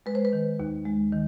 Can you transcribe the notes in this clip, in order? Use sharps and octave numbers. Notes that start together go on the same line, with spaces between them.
G#3 B4
C5
B4
D#3
D#2
G#3
D#3